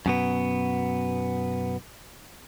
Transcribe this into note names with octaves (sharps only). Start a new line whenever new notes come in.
F#2 B2 B3